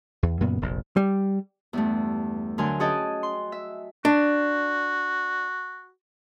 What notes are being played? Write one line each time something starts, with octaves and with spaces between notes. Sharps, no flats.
E2
F#2 A#2 C#3 B3
F1 A#1
G3
E2 G2 A3
D2 D3 F#3 A#4 G#5 C6
C#4 F#4 G#4 D#5 G5 A5
C6
E5
D4 F#4